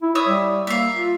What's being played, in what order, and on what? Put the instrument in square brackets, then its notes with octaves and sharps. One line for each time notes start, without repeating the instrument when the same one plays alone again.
[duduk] E4
[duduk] C#5 [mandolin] E5 D#6 E6
[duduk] G3
[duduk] A#3 [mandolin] E5 F5
[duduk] F4